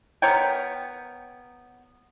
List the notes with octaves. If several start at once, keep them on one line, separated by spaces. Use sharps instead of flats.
B3 A#4 C#5 G5